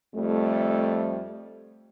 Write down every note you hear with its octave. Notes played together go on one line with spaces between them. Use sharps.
F2 G3 A3